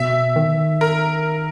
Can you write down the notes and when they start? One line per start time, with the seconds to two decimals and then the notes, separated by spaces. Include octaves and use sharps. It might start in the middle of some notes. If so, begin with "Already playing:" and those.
Already playing: B2 E5
0.36 D#3
0.81 A#4